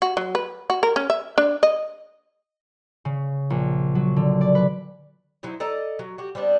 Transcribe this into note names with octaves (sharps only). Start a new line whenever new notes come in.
F#4
F#3
B4
F#4
A#4
C#4
E5
D4
D#5
C#3
A#1
F#3
D3
D5
B4
F#3 C4 D#4 E4
A4 D5 D#5 A#5
F#3
F#4 G4
G3 B3 C4 D4